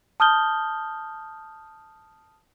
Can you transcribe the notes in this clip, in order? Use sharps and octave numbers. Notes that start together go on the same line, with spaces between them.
A5 D#6 F6 G6 G7